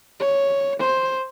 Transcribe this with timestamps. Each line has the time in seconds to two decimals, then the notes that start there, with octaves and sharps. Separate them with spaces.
0.20 C#5
0.79 C5